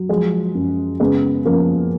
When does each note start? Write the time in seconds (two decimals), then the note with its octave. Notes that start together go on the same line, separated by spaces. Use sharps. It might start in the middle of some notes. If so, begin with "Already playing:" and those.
Already playing: F#3
0.09 F3 G#3
0.55 F#2
1.00 C#3 G#3 B3
1.45 F3 A#3 C#4